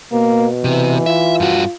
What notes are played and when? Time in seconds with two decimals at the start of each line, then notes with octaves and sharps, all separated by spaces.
0.13 B2 A#3
0.64 C3 E3
1.06 F4 E5
1.40 G2 F#4